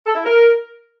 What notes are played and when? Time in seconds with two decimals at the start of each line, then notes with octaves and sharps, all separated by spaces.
0.06 A4
0.15 E4
0.24 A#4